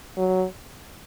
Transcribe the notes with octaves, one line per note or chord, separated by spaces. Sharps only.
F#3